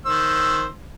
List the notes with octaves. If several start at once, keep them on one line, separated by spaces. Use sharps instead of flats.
D#3 C5 E6